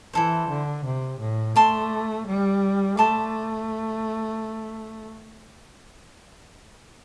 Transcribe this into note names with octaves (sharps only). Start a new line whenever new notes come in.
E3 E4 A4 C5
D3
C3
A2
A3 D5 A5 C6
G3
A3 D5 A5 C6